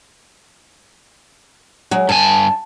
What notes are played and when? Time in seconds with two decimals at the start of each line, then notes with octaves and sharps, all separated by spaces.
1.91 F#3 G#3
2.09 G2 G#5 A5